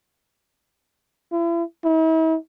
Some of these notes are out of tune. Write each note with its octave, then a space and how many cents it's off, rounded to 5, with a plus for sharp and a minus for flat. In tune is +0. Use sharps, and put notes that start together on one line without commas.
E4 +40
E4 -45